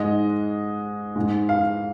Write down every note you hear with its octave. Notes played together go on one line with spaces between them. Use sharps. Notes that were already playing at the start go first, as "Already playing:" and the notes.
Already playing: G#2 G#3 D#5
G#2 G#3
F5